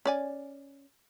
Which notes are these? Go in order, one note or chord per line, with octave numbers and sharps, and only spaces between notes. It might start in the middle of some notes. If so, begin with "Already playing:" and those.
C#4 D5 G#5